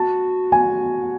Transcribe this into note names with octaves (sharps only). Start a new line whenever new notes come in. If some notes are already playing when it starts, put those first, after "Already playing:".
Already playing: F#4 A5
G#5